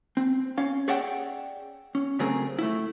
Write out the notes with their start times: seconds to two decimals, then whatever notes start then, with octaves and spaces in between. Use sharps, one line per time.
0.17 C4
0.58 C#4 F5
0.88 G#4 C#5 D5 E5 F#5 G5
1.95 C#4
2.19 C#3 F#3 A3 C4 G#4 A#4
2.59 A3 E4